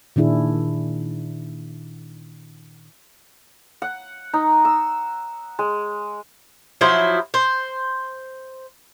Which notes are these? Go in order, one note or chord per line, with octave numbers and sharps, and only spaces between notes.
A#2 D#3 D4 E4 G#4
F#5
D#4
E6
G#3
F3 F#3 E4 C5
C5